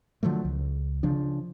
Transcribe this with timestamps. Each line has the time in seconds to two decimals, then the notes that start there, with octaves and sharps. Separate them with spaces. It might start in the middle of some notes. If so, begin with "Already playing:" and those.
0.23 D3 F3 F#3 A3
0.45 C#2
1.03 C#3 F3 D4